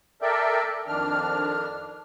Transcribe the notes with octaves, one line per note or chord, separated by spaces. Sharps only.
A4 A#4 D5 E5 G5
F2 D#3 D4 F6